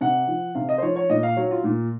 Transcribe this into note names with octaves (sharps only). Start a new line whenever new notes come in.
C3 F#5
F3
C3 F5
D#5
C5
F3 C#5
C#5
A#2 D#5
F5
F#3 C#5
F4
A#2